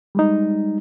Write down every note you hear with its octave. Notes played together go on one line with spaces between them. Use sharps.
G3 G#3 D#4